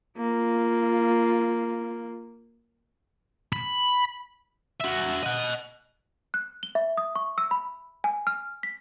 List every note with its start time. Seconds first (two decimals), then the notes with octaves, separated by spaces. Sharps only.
0.18 A#3 F4
3.53 B5
4.81 F#4 E5
5.23 D#5 F#5
6.34 F#6
6.63 G7
6.75 E5
6.97 D#6
7.16 C#6
7.38 E6
7.51 B5
8.04 G#5
8.27 F6
8.63 B6